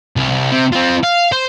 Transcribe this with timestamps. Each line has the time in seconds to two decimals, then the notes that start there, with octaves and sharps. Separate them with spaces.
0.16 C2
0.52 C3 C4
0.73 C4 F4
1.04 F5
1.32 C5